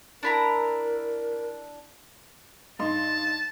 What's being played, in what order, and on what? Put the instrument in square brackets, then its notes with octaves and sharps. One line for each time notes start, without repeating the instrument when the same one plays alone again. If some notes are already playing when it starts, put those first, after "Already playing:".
[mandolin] D4 E4 A#5 [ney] A#4
[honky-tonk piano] G2 D#4 C6 [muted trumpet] A5